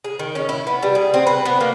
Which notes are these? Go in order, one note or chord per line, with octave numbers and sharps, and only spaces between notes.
G#4
D#3
C#4
E4
B3
G3
G#4
C4
B4
B3
A#3